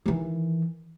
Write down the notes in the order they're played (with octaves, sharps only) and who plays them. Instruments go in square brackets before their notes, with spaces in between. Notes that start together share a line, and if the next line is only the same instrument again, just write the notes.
[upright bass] D#3 E3